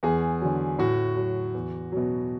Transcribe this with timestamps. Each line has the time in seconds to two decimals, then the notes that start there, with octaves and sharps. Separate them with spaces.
0.03 E2 G#4
0.41 D3 F#3
0.79 A2 F#4
1.17 F#3
1.54 E2
1.92 B2 F#3